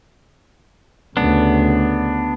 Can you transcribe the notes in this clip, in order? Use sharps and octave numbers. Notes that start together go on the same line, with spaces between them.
D2 C#3 B3 D4